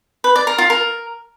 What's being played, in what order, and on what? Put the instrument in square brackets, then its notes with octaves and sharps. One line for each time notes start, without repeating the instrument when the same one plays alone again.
[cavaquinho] B4
D5
A#4
F4
A#4